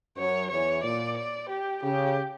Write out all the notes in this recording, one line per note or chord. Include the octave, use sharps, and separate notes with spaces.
F#2 F#3 C#5
E2 E3 C#5
A#2 D5
D5
G4
C#3 G4